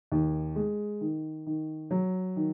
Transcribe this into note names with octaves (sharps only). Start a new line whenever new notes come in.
D#2
G#3
D#3
D#3
F#3
D#3